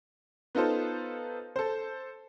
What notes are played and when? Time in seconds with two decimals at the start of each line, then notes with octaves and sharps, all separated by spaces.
0.55 B3 D#4 F4 A4 C5
1.56 A4 C5